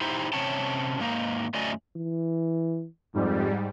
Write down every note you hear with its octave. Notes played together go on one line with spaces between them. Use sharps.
D#4 E4 G4 C5
C3 C#4 C#5 G5 A5
G#2 A#3 D#4
F#2 F#3 A3 D5 D#5 G#5
E3
F2 G#2 G3